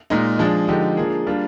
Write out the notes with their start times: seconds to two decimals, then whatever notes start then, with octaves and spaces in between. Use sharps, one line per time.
0.10 A#2 G#3 D#4
0.39 F3 G#3 D4 G#4
0.68 D3 F3 G#3 D#4 G4
0.97 F3 A#3 D4 G#4
1.26 G3 A#3 D4 F4